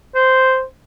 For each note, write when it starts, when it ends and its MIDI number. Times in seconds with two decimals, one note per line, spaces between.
0.15 0.63 72